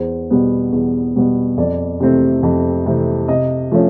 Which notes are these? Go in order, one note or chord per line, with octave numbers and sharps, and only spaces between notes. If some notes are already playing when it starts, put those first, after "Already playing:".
Already playing: E2 C5
B2 G3 B3
E2
B2 G3 B3
F2 D5
C3 E3 A3 C4
F2
C3 E3 A3 C4
C3 D#5
F3 A3 C#4 F4